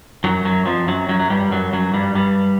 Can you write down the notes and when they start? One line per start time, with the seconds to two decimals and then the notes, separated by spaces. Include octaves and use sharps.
0.24 F#2 F#3
0.44 F#2 F#3
0.66 F2 F3
0.88 F#2 F#3
1.09 F#2 F#3
1.20 F#3
1.30 G2 G3
1.51 F#2 F#3
1.73 F#2 F#3
1.94 G2 G3
2.14 G2 G3